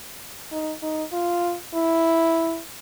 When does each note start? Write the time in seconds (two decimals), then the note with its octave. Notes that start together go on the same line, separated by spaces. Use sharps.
0.52 D#4
0.82 D#4
1.12 F4
1.74 E4